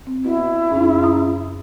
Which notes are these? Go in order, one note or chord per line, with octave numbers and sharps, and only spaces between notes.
C4
B2 E4
F#2 C#3 D#4
A#5 D#6